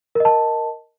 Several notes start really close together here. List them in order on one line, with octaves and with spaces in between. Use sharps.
A#4 D#5 A5